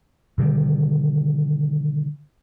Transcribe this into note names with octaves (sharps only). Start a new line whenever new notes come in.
B2 D3 D#3 G3